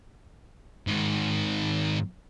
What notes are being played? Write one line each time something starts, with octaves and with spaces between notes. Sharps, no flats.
G#2 D#3